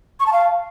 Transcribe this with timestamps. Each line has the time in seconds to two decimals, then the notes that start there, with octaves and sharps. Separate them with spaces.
0.20 C#6
0.26 A5
0.33 F5